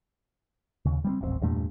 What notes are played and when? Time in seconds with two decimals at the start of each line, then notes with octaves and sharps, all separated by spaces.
0.85 D#2 C#3
1.04 G3 B3 C4
1.21 D#1 A1 G2 C4
1.42 E2 G2 A#2 A3